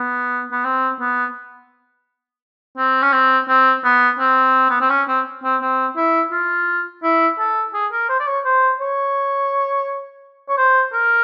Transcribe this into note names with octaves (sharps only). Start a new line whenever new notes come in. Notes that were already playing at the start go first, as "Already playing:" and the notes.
Already playing: B3
B3
C4
B3
C4
C#4
C4
C4
B3
C4
B3
C4
C#4
C4
C4
C4
E4
F4
E4
A4
G#4
A#4
C5
D5
C#5
C5
C#5
C#5
C5
A#4